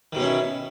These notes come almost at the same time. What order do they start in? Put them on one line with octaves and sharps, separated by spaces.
D#3 B2 C#4 E4